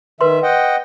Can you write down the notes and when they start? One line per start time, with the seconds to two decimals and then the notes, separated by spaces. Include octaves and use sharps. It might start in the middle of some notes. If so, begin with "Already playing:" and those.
0.21 D#3 B4 E5 C6
0.43 D#5 F#5 G5